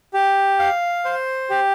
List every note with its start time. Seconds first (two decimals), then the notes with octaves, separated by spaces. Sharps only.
0.14 G4
0.59 F5
1.05 C5
1.50 G4